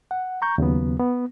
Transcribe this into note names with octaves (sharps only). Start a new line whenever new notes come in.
F#5
A#5 C#6 G6
D#2 C#3 F#3 B3
B3